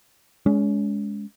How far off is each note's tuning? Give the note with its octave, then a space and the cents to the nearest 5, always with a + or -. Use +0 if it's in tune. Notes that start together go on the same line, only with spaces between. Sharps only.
G#3 +0 C#4 +35